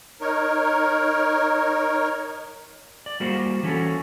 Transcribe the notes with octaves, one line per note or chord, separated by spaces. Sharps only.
D#4 A#4 C#5
D5
G3 A#3 F#4 C5
E3 C#4 F#4 A4